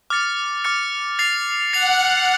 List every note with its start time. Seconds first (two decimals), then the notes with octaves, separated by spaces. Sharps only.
0.10 D6 F6 A6 C#7
0.64 D6 F6 A6 C#7
1.19 A6 C7 F7
1.73 F#5 A6 C7 F7